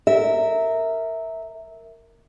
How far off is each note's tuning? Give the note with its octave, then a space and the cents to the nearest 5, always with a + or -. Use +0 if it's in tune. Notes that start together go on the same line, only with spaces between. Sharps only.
A#4 -15 E5 -15